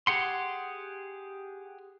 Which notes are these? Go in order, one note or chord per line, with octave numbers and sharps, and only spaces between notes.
G4 G#4 F#5 C6